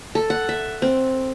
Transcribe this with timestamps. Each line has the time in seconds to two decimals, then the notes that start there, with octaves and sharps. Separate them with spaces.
0.15 A4
0.30 F#5
0.49 E5
0.82 C4